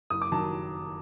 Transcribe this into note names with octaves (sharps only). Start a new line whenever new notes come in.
F#1 D#6
D6
D#3 F#3 A5